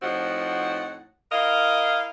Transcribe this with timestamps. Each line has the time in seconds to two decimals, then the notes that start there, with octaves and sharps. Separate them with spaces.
0.02 A2 F3 C4 D#4 F#4 F#5
1.31 E4 A#4 D#5 F5